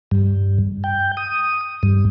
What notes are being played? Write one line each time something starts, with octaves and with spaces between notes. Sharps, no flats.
G2
G5
D#6
G2